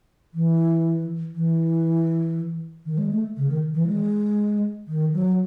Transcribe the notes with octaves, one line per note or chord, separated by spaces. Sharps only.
E3
E3
D#3
G#3
A3
C#3
D#3
E3
G#3
D#3
F#3